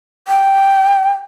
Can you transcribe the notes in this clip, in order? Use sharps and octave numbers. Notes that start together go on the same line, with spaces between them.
G5